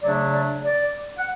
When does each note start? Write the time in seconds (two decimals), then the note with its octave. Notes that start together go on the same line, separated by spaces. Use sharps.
0.03 C#3 F#3 A3 D4 D5
0.33 D5
0.65 D5
1.18 F#5